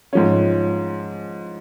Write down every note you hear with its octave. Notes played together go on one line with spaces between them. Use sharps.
G#2 F3 C#4